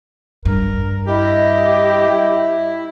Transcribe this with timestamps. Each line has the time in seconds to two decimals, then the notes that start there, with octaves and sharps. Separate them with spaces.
0.45 G2 A#4
1.07 E4 G4 D#5